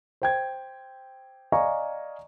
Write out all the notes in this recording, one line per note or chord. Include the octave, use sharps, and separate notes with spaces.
C5 G5 G#6
D5 D#5 F5 G#5 A#5 C#6